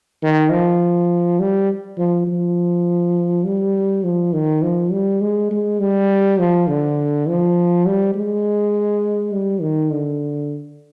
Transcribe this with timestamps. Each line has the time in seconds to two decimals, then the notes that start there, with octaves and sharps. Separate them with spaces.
0.23 D#3
0.51 F3
1.40 G3
1.98 F3
2.27 F3
3.45 G3
4.04 F3
4.33 D#3
4.62 F3
4.91 G3
5.21 G#3
5.51 G#3
5.79 G3
6.39 F3
6.68 D3
7.27 F3
7.86 G3
8.14 G#3
9.33 G3
9.61 D#3
9.92 D3